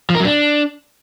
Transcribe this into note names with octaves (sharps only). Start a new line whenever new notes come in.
F3
A#4
F#3
D4